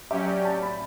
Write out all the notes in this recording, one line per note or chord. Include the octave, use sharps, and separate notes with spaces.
F#3 C#4 G4 E5
D5
A5
B5